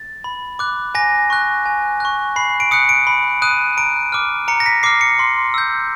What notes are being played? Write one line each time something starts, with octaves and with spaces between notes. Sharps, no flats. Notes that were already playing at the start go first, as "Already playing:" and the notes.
Already playing: A6
B5
D6 F#6
G#5 A#6
C#6 F#6
G#5
C#6 F#6
B5 C7
D7
D#6 F#6 C#7
D7
B5
D#6 F#6 D#7
A#5 D7
D6 F6
A#5 C#7
A#6
B6
D6 F6 C7
C#7
C6
E6 G6